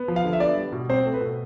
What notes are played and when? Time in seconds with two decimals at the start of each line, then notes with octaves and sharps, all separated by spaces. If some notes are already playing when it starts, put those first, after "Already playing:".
Already playing: B3
0.08 F3
0.16 F5
0.25 D3
0.33 E5
0.40 B3 D5
0.56 G3
0.72 B2
0.89 C4 C5
1.06 A3
1.14 B4
1.21 B2